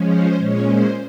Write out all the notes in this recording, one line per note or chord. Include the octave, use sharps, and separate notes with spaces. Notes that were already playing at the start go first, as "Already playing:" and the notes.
Already playing: F3 G#3 C#4
C5
A#2 G#3 C#4 C#5
C5